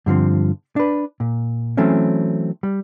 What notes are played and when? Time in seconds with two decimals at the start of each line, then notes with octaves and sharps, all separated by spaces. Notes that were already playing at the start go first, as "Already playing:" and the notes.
0.06 G2 D3 F3 C4
0.76 D4 B4
1.20 A#2
1.77 E3 F#3 A3 C4 C#4
2.63 G3